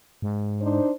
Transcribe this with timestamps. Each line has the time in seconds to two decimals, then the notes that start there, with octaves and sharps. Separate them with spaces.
0.22 G#2
0.62 D4 D#4 C5